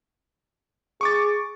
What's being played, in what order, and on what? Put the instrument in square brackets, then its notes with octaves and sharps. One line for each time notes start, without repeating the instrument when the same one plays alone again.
[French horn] G#4 [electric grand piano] C#6 D6 A6